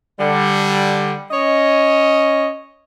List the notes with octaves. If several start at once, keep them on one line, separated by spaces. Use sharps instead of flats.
D3 G3
C#4 C#5 D#5